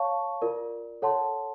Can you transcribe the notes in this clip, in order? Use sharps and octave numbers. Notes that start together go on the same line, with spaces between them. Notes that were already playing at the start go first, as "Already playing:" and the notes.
Already playing: C#5 F5 A5 C#6
F4 A#4 D5
A4 C#5 F#5 A5 C6